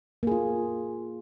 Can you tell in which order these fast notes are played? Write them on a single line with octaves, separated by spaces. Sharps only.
A#3 G#4 F4